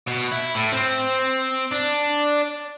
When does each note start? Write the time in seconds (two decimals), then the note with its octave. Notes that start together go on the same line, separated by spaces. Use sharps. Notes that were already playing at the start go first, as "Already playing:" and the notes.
0.07 B2
0.32 E4
0.55 A2
0.72 C4
1.72 D4